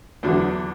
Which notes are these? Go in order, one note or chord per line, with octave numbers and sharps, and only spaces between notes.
E2 D3 F#3